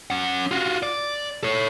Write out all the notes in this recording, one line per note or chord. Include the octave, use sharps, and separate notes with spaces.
C#4 F#5
F4 F#4
D5
A4 C#5